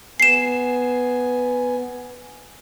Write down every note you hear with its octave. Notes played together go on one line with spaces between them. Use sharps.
B3 G#5 C7 E7